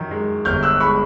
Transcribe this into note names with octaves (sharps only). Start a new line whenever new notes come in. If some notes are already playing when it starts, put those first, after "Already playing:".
Already playing: F#2 D#3
G#3
G1 F6 G6
E6 F#6
G#3 B5 C#6